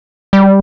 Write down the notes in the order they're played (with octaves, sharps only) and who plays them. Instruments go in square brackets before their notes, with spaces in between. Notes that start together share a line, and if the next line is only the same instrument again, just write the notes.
[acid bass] G3